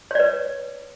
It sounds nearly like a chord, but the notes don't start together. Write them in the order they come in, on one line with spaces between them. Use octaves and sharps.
C#5 D5 B4